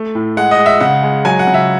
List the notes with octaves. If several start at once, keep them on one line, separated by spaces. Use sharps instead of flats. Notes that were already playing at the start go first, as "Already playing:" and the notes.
Already playing: A3
A2
G#3 F#5
D#5
G#3
E5
C#3 F#5
G#3
F#3 G#5
F#5
C#3
E5